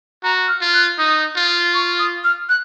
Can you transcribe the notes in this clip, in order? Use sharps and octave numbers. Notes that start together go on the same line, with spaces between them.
F#4 A#5
F6
F4
F#6
D#4 D#6
F4
C#6
D#6
F6
F#6